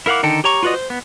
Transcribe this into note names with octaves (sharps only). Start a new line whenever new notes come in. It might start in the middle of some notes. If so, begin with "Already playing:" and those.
E4 A#4 F5 F#5 D6
D3 D#3 D#4 A4 G5
G4 C#5 A#5 C#6
F4 F#4 B4 D5 D#5
C5
B3